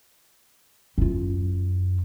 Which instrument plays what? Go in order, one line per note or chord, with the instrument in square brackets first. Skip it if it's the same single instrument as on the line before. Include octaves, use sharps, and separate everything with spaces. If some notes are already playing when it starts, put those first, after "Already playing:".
[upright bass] F#2 F4